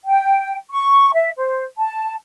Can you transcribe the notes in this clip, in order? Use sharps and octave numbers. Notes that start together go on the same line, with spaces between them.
G5
C#6
E5
C5
A5